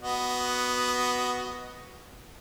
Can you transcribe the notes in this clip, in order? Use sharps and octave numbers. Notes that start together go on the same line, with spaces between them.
B3 F#4 D#5